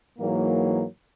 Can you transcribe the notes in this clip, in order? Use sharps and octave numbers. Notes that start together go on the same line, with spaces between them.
G#2 E3 F#3 A#3